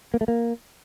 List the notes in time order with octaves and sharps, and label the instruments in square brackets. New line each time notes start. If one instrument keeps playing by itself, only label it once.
[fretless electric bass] A#3
A3
A#3